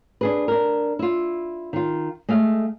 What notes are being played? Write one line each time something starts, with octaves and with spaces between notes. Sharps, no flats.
D4 G#4 B4
D4 A#4
E4 F4
D#3 F4
G#3 A3 F5